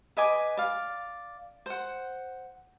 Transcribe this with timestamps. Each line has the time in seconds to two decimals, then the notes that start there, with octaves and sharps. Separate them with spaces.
0.17 B4 D#5 G#5 D6
0.57 D5 F5
1.66 C5 F#5